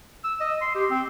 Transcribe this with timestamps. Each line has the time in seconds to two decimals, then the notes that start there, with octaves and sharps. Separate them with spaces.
0.25 E6
0.41 D#5
0.61 C6
0.75 G4
0.91 C4